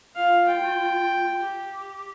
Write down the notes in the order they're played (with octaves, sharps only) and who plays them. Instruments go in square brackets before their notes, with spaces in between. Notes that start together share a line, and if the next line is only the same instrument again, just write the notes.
[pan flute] F4 [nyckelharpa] F5
[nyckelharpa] G5
[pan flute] G4